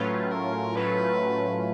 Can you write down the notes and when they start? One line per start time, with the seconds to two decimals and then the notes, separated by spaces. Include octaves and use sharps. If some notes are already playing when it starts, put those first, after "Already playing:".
Already playing: A2 F#3 A3 C#4 F4 B4
0.31 A#4
0.75 A2 F#3 A3 C#4 F4 B4